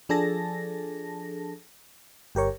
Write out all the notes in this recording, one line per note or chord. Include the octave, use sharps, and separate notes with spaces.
F3 D4 G#4 A4 A5 A#6
G1 G4 A#4 C#5